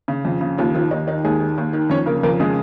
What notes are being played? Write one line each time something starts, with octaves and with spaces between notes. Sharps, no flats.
C#3
F2
C#3
D#2 F3 F4
D#3 F3 F4
D#2 D#4
D#3 D#4
D#2 G#3 G#4
D#3
D#2
D#3
F2 C#4 C#5
C#3 A#3 A#4
F2 A#3 A#4
C#3 G#3 G#4